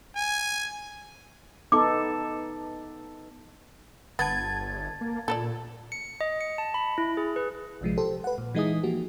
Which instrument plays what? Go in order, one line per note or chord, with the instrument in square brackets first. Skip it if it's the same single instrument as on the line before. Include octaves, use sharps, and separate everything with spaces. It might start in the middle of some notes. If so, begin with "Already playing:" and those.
[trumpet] G#5
[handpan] B3 D#4 A4 [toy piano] D6
[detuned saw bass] G1 [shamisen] B3 [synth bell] A5 G#6 A6
[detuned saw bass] A#3
[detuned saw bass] A#2 [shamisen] A4 B4 D5
[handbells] C#7
D#5
C#7
A5
B5
E4
G#4
B4
[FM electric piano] A#1 C3 F3 G#3
G4 A4 C5
B4 F#5
A#2
E3 G#3 D#4 E4 G#4 D#6
F3 A#3 F#4 G4